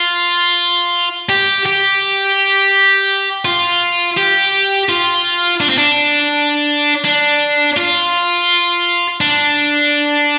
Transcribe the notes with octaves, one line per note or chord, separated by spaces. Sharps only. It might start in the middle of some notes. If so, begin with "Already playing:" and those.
Already playing: F4
G4
G4
F4
G4
F4
D4
C4
D4
D4
F4
D4